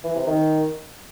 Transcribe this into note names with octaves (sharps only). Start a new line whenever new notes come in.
E3
C3
D#3